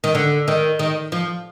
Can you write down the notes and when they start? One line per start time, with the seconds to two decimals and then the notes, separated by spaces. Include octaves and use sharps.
0.04 D#3
0.15 D3
0.48 D#3
0.79 D#3
1.12 F3